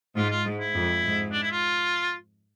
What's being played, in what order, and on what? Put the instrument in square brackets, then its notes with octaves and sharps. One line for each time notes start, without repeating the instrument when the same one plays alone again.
[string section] G#2 [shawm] F4
[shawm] F4
[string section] G#2
[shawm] E4
[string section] F2
G#2
[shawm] D4
E4
F4